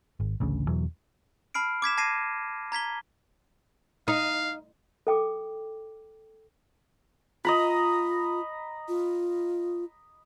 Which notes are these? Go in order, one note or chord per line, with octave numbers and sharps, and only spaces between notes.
G#1
A1 D2 C#3
E2 B2 E3 F#3
A5 B5 F6 C7 D7
D6 G#6 B6 E7
A5 G#6 A#6 C7 D#7 E7
A#5 G#6 B6 G7
D#4 F5
A4 G5 D6
F4 D#5 A#5 B5
F4